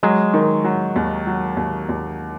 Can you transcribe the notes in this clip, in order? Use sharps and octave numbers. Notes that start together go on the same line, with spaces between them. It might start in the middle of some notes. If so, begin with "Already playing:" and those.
F#3 G#3
D#3
F#3
D#2
F#3
D#2
D#2